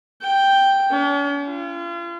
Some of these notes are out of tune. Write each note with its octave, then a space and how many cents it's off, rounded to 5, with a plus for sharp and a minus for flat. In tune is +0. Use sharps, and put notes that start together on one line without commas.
G5 +0
C#4 +45
F4 -35